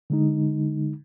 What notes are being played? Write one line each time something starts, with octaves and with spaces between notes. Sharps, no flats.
D3 G#3 D#4